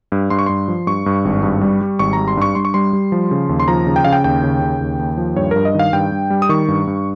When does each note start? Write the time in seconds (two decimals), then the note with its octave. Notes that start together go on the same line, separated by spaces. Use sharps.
0.12 G2
0.30 G2 C6
0.39 C#6
0.46 G2 C6
0.68 F3
0.87 G2 C#6
1.06 G2
1.25 G#1
1.43 G2
1.61 G3
1.81 G3
1.99 G#1 C#6
2.13 A#5
2.18 G3
2.28 C6
2.37 G2 C#6
2.55 G2 C6
2.65 C#6
2.74 G3 C6
2.93 G3
3.12 F3
3.31 C#3
3.49 D#2
3.60 C6
3.68 F3 A#5
3.87 C#3
3.96 G5
4.05 C#3 F5
4.13 G5
4.24 D#2 G5
4.43 C#3
4.62 C#3
4.81 D#2
4.99 D#2
5.18 F3
5.36 G2 C#5
5.51 G2 A#4
5.65 D#5
5.75 D#3 F5
5.93 G2 G5
6.12 G2
6.30 G3
6.42 D#6
6.49 D#3 C#6
6.68 G2
6.87 G2